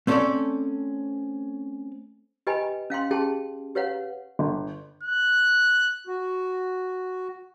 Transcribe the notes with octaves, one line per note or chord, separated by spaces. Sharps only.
A3 C4 C#4 A4 C#5 D5
G4 B4 D#5 G5 G#5 B5
C#4 F5 G5 C6
C#4 G4 G#4 G5 A5 C6
G4 B4 C#5 F5 F#5
G1
F#6
F#4